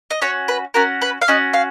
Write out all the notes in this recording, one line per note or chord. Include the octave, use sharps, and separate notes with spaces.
D#5
C#4 F#4 C#5
B4
C#4 F#4 A#4
B4
F5
C#4 F#4 D#5
F5